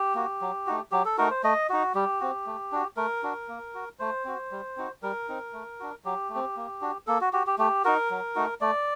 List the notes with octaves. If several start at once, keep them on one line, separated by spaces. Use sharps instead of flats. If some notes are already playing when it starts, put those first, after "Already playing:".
Already playing: G4
A#3 F#4
F#3
A3 D#4 F#4
F#3 G4
A4
A3 D#4 F#4 A#4
C5
A3 D#5
D#4 F#4
G3 G4
C4 F#4
A3
D4 F#4
A3 A#4
D4 F#4
A#3
F#4
A3 C5
C4 F#4
G3
C4 D#4 F#4
G3 A#4
C4 D#4
A3
D4 F#4
F#3 G4
A3
C4
A#3
D4 F#4
A#3 A4
F#4
F#4 G4
G4
A3 G4
D#4 F#4 A#4
F#3
A3 D#4 F#4
A3 D5